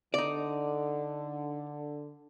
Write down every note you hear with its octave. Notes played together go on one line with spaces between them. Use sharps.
D3 D#4 D5